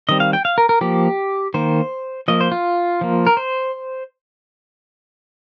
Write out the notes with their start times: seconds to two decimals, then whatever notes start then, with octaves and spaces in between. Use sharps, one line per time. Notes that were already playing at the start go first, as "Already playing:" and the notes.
0.09 D#3 G3 C4 D#5
0.20 F5
0.33 G5
0.45 F5
0.58 A#4
0.69 A#4
0.81 F3 A#3 G4
1.54 D#3 A#3 C5
2.28 F3 A#3 D#5
2.41 C5
2.52 F4
3.01 F3 A#3
3.27 A#4
3.37 C5